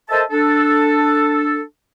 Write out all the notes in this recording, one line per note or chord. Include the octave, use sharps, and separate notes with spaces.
A4 A#4 C5 D#5 E5 A5
D4 A4